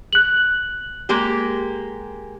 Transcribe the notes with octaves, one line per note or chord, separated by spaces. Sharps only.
F#6 F#7
G#3 A#3 G4